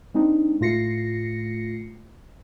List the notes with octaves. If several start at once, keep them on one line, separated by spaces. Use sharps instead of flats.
G#3 C4 D4 D#4
A2 A3 F4 A#6 C7 C#7